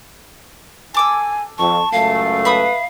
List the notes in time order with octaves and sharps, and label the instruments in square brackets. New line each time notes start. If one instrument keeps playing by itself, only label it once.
[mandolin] A4 D6 E6 [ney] G#5
[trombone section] F2 [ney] A5 [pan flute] C#6
[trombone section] C#2 F#2 A3 [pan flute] F5
[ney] B4 [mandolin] E5 B5 D#6